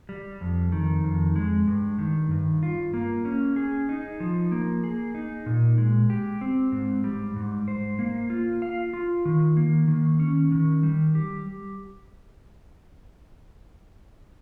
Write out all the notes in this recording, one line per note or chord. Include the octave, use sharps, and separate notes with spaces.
G3
F2
D#3
F2
G#3
G2
D#3
G2
F4
A#3
C#4
G#4
D#4
F3
A#3
G#4
D#4
A#2
G#3
G4
C4
G#2
G3
G#2
C5
A#3
F4
F5
F4
D#3
A#3
D#3
C#4
D#3
G3
G4